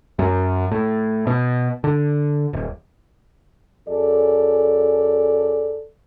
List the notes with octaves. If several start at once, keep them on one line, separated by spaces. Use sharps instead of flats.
F#2
A2
B2
D3
D#1
F#2 G#4 A4 D5